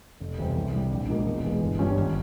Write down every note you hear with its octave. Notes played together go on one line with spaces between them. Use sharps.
F1
E2 C3 G3 C4
C2
C3 G3
A#1
G#2 F3 A#3
E1
E2 E3 G#3
G1
G2 G3 C#4 F4
G#1